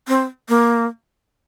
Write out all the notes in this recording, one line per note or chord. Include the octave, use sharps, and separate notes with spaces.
C4
A#3